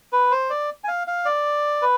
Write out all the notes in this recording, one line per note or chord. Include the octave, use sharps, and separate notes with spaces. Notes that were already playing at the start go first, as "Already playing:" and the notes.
B4
C5
D5
G#5
F5
F5
D5
B4